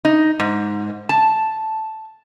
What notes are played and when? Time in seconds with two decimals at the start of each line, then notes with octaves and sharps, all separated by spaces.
0.05 D#4
0.40 G#2
1.09 A5